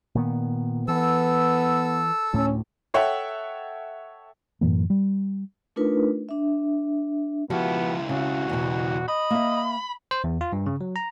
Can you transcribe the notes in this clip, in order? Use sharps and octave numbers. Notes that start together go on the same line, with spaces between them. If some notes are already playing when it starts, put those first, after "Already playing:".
A#2 D#3 B3
E3 B3 A4 E6
D2 A2 C#4
A4 C#5 E5 F#5 G5
F#2 A2 E3 A#3
G3
A3 D4 D#4 F4 A#4 B4
D4 E5
C#2 F3 B3 E4 F#4 G4
C#3 F#4
E2 B2
D#5 B5
A#3 E5
C5
E2
F4
G2
C#3
F#3
A#5